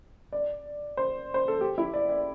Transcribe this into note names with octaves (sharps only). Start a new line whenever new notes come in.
D5
C5
C5
A4
G4
E4
D5
D5